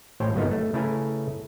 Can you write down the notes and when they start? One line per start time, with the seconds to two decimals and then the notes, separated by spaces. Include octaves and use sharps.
0.20 A1 A2 C5 C#5 G5
0.34 G1 F#2 C#3 A#3 B3 D#4
0.51 A3
0.73 C#3 A3 E4 B4 G#5 A#5